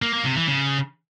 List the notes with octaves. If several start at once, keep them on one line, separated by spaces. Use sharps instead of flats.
A#3
A#3
C3
E3
C#3